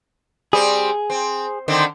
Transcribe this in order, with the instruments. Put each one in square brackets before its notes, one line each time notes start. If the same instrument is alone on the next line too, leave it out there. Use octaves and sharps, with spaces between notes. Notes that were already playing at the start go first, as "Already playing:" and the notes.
[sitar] G3 C4 [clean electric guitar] G#4
[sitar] C4
D3 D#3 C4